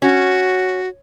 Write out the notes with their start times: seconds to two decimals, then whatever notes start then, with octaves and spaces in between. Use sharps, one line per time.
0.02 C#4 F#4